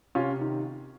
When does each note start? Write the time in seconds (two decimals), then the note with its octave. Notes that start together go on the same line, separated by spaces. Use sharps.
0.15 C3 C#4 F4
0.40 D#3